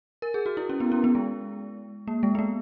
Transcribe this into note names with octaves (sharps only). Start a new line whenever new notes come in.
A#4
G#4
F#4
E4
C#4
B3
C#4
B3
G#3
A#3
G#3
B3
A#3